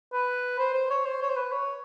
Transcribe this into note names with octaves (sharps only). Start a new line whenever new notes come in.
B4
C5
C5
C#5
C5
C#5
C5
B4
C#5